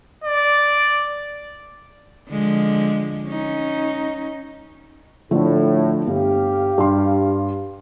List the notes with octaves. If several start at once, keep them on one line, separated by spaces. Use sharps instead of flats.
D5
D3 F3 G#3
C#4 D#4
A2 D3 F3 A3
G1 G4 F5
G2 C6